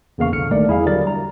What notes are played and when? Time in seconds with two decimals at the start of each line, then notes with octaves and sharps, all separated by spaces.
0.18 E2 C#3 A#3 F5 C#6
0.32 A#1 D3 F6 C#7
0.51 D#3 G3 A3 A#3 A#4 D5
0.67 E2 E4 G#4 F5
0.86 D3 F#3 G3 A#4 A6
1.07 A#5